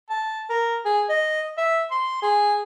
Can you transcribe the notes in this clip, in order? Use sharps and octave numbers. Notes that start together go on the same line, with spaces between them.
A5
A#4
G#4
D#5
E5
C6
G#4